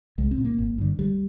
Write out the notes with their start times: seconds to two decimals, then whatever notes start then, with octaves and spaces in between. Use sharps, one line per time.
0.18 C2 G#3
0.31 C4
0.38 A#2
0.45 A#3
0.58 G#1
0.78 G2 D3
0.98 D2 G3